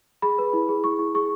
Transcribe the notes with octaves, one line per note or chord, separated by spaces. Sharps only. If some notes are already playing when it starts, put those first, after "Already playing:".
G#4 B5
B4
E4
G#4
E4 C#6
E4
G#4 C#6